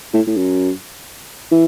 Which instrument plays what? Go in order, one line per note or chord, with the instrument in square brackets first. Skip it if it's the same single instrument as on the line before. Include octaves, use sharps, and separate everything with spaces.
[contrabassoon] A2
A2
F#2
E3